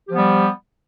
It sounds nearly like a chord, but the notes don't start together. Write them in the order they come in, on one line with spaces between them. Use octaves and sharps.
G4 F3 B3 G3